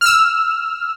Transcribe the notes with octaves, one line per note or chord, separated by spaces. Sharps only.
E6 F6